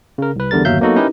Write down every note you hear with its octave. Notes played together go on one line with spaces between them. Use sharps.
C#3 A#4
C2 B4
E2 D3 G3 A#4 A6
G1 D#2 F#3 E5 F5 G6
F#3 A#3 B3 D#4 F#4 A4
C#4 D#4 E4 G4 A#4 B4